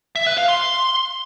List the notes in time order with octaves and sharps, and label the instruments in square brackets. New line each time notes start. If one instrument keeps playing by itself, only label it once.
[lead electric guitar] E5
B4
F5
C6